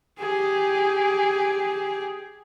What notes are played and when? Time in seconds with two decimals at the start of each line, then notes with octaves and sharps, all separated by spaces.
0.19 G4 G#4